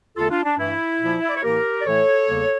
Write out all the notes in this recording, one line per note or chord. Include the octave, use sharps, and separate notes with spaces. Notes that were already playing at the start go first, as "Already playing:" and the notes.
E2 D3 A3 F4 A4
D4 F4
D4
G2 E3 A3 E4
A#2 F3 A#3
E5
D5
C#5
A2 E3 A#3 G4 A#4
D5
A2 E3 A3 A4 C#5
E2 C#3 G3 A#3